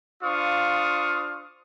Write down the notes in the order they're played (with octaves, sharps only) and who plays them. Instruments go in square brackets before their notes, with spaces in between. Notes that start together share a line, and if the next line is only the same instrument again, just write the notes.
[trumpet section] D4 F4 C5 F5 C#6 D#6